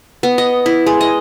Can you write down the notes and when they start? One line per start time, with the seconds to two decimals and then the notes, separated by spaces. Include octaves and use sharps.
0.23 B3
0.38 D#5
0.66 E4
0.87 G#3
1.01 D#5